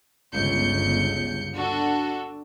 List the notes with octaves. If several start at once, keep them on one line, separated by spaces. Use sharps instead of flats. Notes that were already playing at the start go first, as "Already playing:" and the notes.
G1 C#2 G6 C#7
D4 F#4 A4